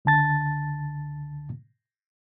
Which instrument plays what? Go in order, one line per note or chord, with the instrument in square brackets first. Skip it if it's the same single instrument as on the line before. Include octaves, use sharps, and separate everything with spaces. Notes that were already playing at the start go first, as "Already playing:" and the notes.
[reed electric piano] C#2 D3 A5 A6